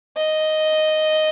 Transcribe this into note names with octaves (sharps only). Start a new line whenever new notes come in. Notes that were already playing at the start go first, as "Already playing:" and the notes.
D#5